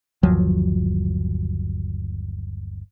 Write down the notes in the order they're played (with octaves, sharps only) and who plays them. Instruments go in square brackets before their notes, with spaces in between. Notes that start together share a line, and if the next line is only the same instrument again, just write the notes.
[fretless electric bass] G1 D#2 F3 F#3